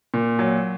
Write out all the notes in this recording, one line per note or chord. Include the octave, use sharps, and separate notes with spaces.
A#2
F#3